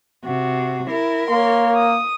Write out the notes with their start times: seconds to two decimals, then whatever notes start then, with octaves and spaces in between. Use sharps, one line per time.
0.25 C3 F#4
0.90 E4 A#4
1.30 A#3 C#5 C6
1.77 D#6